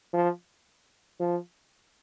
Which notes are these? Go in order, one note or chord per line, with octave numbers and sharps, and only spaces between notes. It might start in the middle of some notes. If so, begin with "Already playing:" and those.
F3
F3